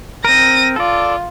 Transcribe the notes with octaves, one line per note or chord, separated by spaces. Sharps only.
C4 A#4 A#6 D#7
F4 A4 D5